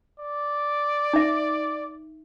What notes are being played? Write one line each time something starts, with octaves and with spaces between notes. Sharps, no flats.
D5
D#4 E5